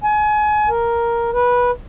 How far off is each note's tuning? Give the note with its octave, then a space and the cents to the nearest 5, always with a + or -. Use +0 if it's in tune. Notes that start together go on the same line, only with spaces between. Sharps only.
G#5 +30
A#4 +5
B4 -15